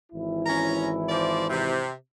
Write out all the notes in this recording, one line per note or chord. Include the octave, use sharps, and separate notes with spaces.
G#1 E3 E4
C#4 A#5
F3 C5 D5
C3